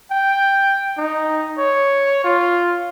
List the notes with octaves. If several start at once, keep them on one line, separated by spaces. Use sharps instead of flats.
G5
D#4
C#5
F4